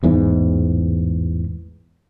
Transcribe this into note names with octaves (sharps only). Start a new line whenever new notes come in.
A1 E2 G#2 E3